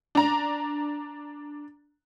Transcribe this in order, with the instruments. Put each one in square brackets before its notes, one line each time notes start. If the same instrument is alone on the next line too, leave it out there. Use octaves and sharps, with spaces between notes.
[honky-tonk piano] D4 A#5